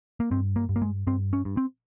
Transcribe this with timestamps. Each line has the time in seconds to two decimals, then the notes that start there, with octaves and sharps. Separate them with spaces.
0.20 A#3
0.31 G2 C4
0.56 A#3
0.69 G2
0.76 A#3
0.82 G#3
1.07 G2 C4
1.33 C#4
1.45 G2
1.57 C4